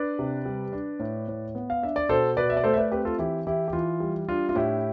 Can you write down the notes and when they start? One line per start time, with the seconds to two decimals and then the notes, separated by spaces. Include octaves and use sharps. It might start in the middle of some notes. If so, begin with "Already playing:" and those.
Already playing: D4 B4 D5
0.19 C3
0.46 G3
0.72 D4
1.00 A2
1.28 A2
1.55 B3
1.70 F5
1.82 D4 E5
1.96 D5
2.09 B2 A4 C5
2.37 B2 B4 D5
2.50 E5
2.57 D5
2.64 A3 A4 C5
2.74 E5
2.78 B4 D5
2.92 C4 G4 B4
3.05 F4 A4
3.18 E3 E4 G4
3.47 E3 E4 G4
3.68 G4
3.73 E3 F4
4.00 G3
4.29 D4 F4
4.49 F4
4.55 A2 E4 G4